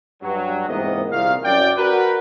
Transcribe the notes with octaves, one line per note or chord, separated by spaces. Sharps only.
G2 F#3
E2 G#2 C3 A#3 B3 D#5
C2 A#2 D#3 F5
F#2 D5 G5
F#4 A#4 B4